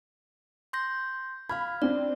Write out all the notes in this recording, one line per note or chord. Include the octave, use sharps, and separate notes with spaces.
C6 G6 A#6
F5 B5 F6 G#6
C4 D4 D5